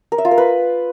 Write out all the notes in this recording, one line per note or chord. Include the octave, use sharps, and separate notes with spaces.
A#4
E5
F4
A#4
B4